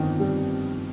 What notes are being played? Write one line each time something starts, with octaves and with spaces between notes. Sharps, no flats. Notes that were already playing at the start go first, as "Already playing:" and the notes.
Already playing: G1 F2 D#3
G3